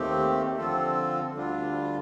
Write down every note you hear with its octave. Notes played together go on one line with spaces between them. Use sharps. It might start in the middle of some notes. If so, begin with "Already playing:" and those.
Already playing: D#2 D#3 A3 C4 G4
D3 F3 C4 F4 A4
D2 D3 G3 D4 F4